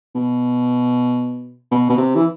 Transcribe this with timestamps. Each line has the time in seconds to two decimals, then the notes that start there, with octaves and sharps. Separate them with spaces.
0.15 B2
1.71 B2
1.90 B2
1.97 C3
2.15 E3